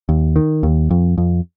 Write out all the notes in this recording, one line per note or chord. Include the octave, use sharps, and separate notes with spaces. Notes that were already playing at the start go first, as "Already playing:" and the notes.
D#2
D#3
D#2
F2
F2